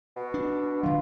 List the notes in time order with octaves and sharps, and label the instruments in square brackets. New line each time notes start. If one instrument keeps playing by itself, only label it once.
[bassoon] B2
[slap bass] D4
[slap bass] D3 F#3 [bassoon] F4